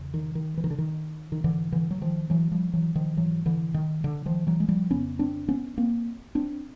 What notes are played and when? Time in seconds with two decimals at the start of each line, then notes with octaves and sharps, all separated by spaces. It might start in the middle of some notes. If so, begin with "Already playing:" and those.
Already playing: E2 C#3
0.14 D#3
0.35 D#3
0.57 E3
0.64 D#3
0.70 D3
0.78 D#3
1.32 D#3
1.44 G#2 D3 E3
1.72 D3 E3
1.91 F#3
2.01 D#3 F3
2.30 E3 F#3
2.52 F3 G3
2.73 E3 F#3
2.95 D#3 F3
3.17 G#2 E3 F#3
3.46 D3 E3
3.74 D#3
4.04 D3
4.26 D#3 F3
4.47 E3 F#3
4.60 G#3
4.69 F3 G3
4.90 F2 C#3 B3 C#4
5.19 C4 D4
5.48 B3 C#4
5.78 A#3 C4
6.35 C4 D4